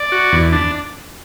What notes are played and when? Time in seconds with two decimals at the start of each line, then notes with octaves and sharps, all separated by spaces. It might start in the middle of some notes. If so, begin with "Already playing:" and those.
Already playing: D5
0.12 F#4
0.32 E2
0.53 D4